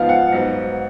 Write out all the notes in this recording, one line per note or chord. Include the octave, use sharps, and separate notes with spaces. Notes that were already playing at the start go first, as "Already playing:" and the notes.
Already playing: G#2 F3 B3 F5
F#5
G#2 F#3 B3